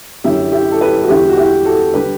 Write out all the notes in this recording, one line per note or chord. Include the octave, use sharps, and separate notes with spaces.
F#2 D3 F#3 E4 G4
E4 G4
A4
G4 B4
F#4
E2 D3 G3 E4 G4
F#4
E4 G4
F#4 A4
D3 G3 G4 B4